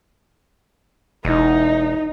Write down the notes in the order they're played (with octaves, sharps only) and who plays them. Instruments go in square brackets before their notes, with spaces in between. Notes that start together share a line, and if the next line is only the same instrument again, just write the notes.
[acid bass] E1 [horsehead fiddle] D#4